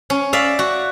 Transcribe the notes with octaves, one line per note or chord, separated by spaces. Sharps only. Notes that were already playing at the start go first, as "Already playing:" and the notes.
C#4
D5 E5 F5
F#4